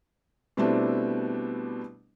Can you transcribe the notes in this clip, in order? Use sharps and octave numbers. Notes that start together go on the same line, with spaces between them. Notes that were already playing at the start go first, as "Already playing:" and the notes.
B2 G3 A3 C4 D4 E4